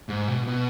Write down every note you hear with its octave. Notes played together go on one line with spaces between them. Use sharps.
G#2
B2
A#2
B2